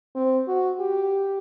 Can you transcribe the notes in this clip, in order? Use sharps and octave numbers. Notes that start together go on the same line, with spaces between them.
C4
F#4
G4